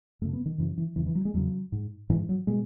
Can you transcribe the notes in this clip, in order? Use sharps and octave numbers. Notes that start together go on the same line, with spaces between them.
F#2 C#3 A3
B3
D#3
F#2 C#3 E3
E3
E2 C#3 E3
E3
F#3
G#3
E2 C#3 F#3
G#2
G#2 E3
F#3
B2 G#3